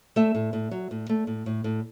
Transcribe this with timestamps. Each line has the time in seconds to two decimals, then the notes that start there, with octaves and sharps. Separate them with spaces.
0.16 A3 E5
0.35 A2
0.53 A2
0.71 F#3
0.91 A2
1.09 A3
1.27 A2
1.46 A2
1.64 A2